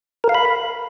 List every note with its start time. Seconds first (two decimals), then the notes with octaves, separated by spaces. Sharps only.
0.24 A#4
0.29 F5
0.35 B5